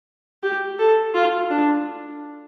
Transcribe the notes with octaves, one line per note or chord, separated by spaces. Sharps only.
G4
A4
F4
D4